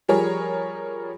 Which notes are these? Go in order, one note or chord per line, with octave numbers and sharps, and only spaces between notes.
F3 G3 G#4 A#4 C#5